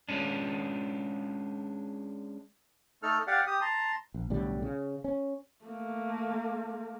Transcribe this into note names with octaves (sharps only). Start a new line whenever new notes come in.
G#3 C#4 D4
A3 D#4 A4 F6
G4 D5 F5 F#5
G4 D#6
A5 A#5 C6
A#1
B1 A2 D3 G3
C#3
C#4
A3 A#3